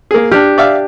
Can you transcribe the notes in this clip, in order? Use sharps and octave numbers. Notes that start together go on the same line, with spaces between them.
A#3 G#4
D4 G4 F6
D5 E5 F5